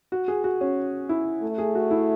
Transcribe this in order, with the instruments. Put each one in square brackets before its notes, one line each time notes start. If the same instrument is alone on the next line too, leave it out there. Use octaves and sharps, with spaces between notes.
[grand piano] F#4
G#4
F#4
C#4
E4
[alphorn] A3
[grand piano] G#4
F#4
E4